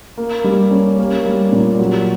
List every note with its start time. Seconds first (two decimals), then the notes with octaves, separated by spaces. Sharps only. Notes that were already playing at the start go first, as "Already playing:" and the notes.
0.18 A#3
0.44 G3
0.71 C#4
0.99 A#3
1.26 G3
1.52 A#2
1.79 F#3